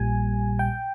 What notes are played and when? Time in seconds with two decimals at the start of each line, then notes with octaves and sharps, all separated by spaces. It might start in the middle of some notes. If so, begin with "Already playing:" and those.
Already playing: A#1 A#2 G3 G#5
0.59 G5